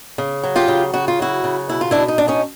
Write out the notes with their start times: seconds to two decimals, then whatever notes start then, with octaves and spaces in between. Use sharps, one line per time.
0.18 C#3
0.43 F#3
0.56 F4 G4
0.68 C#3
0.94 C#3 F#4
1.08 F4
1.19 F#3 E4 F#4
1.44 C#3
1.69 B2 E4
1.81 F4
1.91 B2 D4 E4
2.08 D#4
2.18 B2 D4
2.28 C#4 D#4